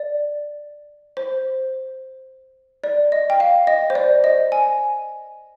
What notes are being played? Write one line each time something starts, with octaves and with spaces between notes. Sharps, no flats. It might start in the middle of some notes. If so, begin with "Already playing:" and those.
Already playing: D5
C5
D5
D#5
G5
F5
D#5
C5
D5
D#5
G#5